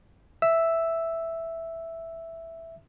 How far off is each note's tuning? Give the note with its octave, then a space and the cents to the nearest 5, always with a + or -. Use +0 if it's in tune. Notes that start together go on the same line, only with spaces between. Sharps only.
E5 +0 E6 +0